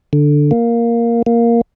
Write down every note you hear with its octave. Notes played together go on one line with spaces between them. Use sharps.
D3
A#3
A#3